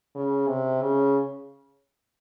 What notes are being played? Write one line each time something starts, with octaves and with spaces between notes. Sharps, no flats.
C#3
C3
C#3